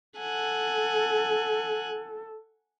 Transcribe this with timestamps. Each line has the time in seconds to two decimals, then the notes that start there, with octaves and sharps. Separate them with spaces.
0.19 A4 F#5 G#5